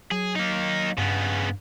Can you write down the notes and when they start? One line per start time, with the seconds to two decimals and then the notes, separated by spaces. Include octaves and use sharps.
0.11 F#3 G#4
0.36 A#3 D#4
0.98 G2 C#3 B3